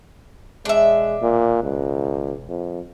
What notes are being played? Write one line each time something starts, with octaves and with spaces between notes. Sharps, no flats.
E1 G#3 D4 E5
A#2
C#2
F2